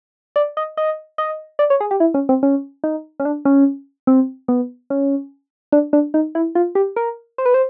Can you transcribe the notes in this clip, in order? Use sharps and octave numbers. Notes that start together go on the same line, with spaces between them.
D5
D#5
D#5
D#5
D5
C#5
G#4
G4
E4
C#4
C4
C#4
D#4
C#4
D4
C#4
C4
B3
C#4
D4
D4
D#4
E4
F4
G4
A#4
C5
B4
C5